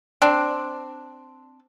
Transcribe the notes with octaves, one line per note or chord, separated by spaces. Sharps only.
C4 D4